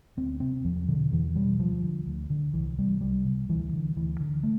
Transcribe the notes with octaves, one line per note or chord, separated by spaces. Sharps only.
D2 C4
C3 C4
E2 F3
B2 D3
E2 E3
B2 G3
D2 F3
D3
D2
D3
C2 E3
C3 G3
C2 G3
C3
D2 E3
D3
D2 E3
D3
A3